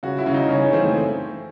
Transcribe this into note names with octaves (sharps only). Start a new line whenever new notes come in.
C#3 F#4
E4
C#3
D#4
C#3 C#4
C#4
E3 C4
A3